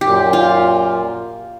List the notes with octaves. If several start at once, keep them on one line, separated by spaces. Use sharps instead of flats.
F#2 A#2 G4
F4